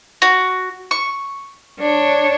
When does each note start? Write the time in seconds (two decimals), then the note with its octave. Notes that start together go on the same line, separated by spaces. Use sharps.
0.22 F#4
0.91 C#6
1.79 D4 C#5